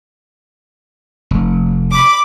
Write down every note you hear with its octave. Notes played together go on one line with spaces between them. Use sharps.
F1
B5 D6